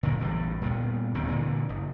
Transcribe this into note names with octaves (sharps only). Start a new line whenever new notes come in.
A#2 D3 D#3 F#3
A1 E2 A2 G3
A#2 G3 G#3 B3
D1 D#2 D#3 C4
A#2 D3 E3
F#1